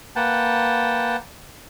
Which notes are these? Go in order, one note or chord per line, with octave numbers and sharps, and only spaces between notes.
A#3 B4 F#5 G5 A5